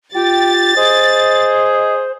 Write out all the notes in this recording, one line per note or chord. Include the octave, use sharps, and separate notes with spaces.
F4 G4 G5 A6
G#4 C5 D#5